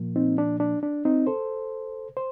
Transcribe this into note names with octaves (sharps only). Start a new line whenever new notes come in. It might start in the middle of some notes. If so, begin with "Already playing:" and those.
Already playing: A#2 F3 A#3
C4 D#4
D4
D4
D4
C4 D#4
A4 C5
C5